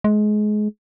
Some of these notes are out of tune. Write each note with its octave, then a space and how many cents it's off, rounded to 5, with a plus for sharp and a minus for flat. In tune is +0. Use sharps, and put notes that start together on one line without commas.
G#3 +25